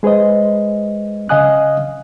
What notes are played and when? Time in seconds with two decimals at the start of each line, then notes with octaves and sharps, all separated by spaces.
0.03 G#3 G#4 B4 C5 D#5
1.29 C#3 D#5 F5 G#5 D#6 F#6